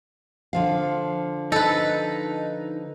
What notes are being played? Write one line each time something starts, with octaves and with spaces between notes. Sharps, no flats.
D3 F3 F5
D#4 A4 B4